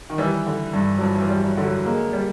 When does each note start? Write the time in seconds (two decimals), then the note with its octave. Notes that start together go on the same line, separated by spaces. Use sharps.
0.10 D#3
0.18 E3 G3
0.46 D3
0.73 G2
0.97 F#3
1.01 G2 F3
1.15 E3
1.22 F3
1.29 G3
1.44 F#3
1.57 D3
1.63 F#3
1.85 G#3 A#3
2.13 G3